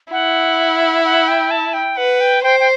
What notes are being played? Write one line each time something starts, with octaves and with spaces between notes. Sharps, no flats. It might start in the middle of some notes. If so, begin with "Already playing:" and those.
E4 F#5
F#5
G5
A5
G5
B4 F#5
G5
C5 G5
G5